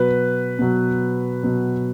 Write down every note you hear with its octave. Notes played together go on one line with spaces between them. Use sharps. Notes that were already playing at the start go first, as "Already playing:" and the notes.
Already playing: B2 F#3 B4
B2 F#3
B2 F#3